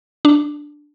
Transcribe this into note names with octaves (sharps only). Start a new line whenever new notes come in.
D4